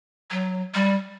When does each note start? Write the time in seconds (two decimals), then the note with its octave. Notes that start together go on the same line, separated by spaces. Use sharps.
0.31 F#3
0.74 G3